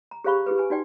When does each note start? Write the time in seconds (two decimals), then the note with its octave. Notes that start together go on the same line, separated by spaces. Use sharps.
0.11 A#5
0.24 G4 G#4 C5 F5 B5 C#6
0.46 E4 G4 G#4 B4
0.58 B4 G#5
0.70 D#4 F#4 D5 G5